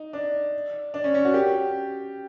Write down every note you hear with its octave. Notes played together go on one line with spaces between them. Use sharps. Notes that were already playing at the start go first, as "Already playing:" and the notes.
Already playing: D#4
D4
D4
C#4
C#4
F#4
G4